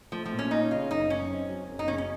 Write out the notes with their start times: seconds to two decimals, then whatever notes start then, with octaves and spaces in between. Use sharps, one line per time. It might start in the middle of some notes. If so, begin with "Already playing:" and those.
0.12 F3 A3
0.26 F3
0.32 A#2
0.39 C#4
0.51 C#4 D#4
0.71 C#3 F4
0.90 F#1 D#4
1.10 F#2 C#4
1.30 C4
1.49 F#3
1.69 F#1
1.79 D#4
1.88 C#3 C#4
1.98 C#4